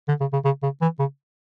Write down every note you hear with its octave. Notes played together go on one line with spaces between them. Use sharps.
D3
C#3
C#3
C#3
C#3
E3
C#3